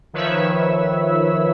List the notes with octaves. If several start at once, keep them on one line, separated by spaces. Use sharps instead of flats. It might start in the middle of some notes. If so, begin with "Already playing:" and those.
D#3 F3 B4 C#5 E5 E6